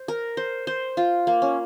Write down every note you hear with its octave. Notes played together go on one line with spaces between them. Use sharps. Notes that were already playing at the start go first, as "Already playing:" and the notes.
Already playing: C5
A#4
C5
C5
F4
A#3
C#4